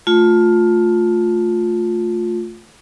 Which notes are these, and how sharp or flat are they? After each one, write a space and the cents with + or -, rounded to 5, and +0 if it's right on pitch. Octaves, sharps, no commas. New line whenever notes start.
A3 +0 F4 +15